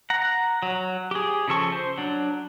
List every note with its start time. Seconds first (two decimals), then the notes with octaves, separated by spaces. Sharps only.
0.10 F#5 A#5
0.63 F#3
1.11 G4 G#4
1.48 C#3 F3 A4 C#6
1.72 C5
1.98 F#3 D4